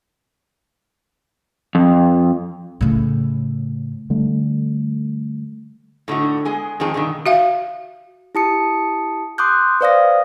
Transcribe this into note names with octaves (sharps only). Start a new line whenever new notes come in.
F2
A2 C#3
D3 G3 A3
A2 D3 D#4 F#4
G#3 B3 G#4 G#5
F2 D#3 C4 G#4 A5
G2 B2 D3 D#3
F#4 E5 F5
E4 G4 A5 D#6 C#7
C6 D6 D#6 F#6 G6
B4 C5 D5 F5 D#6 A#6